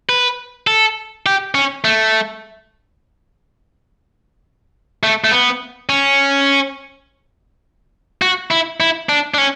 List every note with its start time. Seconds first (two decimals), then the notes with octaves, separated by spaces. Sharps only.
0.09 B4
0.67 A4
1.26 G4
1.55 C#4
1.84 A3
5.03 A3
5.24 A3
5.31 B3
5.89 C#4
8.22 F#4
8.51 E4
8.80 E4
9.09 D4
9.34 D4
9.38 C#4